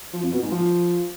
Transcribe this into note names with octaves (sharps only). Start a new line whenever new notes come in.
F3
F2
B2
G#2
F3